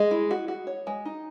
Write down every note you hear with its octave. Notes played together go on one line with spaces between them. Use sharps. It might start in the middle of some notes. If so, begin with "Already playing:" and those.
Already playing: G#3 D#5
E4
F#4
F#4
C#5
G#3
D#4